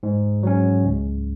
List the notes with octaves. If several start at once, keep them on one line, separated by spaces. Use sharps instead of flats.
G#2
F#3 C#4
C#2